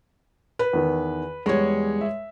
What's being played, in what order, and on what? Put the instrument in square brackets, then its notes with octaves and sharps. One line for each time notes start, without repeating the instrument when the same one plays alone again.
[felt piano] B4
[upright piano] E2 D#3
[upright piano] E2 G3 C#6 [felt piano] G#3 C#5
[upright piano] E5